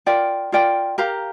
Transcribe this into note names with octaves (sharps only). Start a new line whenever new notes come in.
F4 A#4 D5 G5
F4 A#4 D5 G5
G4 A#4 F5 A#5